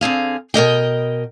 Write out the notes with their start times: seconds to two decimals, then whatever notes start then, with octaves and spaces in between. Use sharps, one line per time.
0.01 D3 C4 G#4 F5
0.54 B2 A#4 D#5 G5